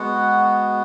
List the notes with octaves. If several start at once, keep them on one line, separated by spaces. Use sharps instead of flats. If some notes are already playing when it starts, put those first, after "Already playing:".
Already playing: G#3 B3 F#4 F#5